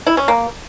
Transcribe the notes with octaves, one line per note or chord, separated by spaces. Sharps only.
E4
C#4
A#3